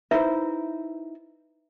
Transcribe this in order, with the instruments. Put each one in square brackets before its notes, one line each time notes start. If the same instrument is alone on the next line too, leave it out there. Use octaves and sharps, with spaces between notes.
[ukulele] D#4 E4 C5 [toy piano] B4 E5